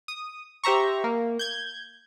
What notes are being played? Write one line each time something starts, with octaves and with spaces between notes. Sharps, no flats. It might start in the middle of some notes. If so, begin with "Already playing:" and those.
D#6
G4 C5 E5 A#5 C#6
A#3
G6 G#6